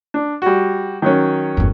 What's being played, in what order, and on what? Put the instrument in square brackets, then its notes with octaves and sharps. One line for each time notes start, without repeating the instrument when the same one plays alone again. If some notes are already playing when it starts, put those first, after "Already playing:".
[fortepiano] D4
G3 F#4
D#3 F#3 C#4
[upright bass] G1 E2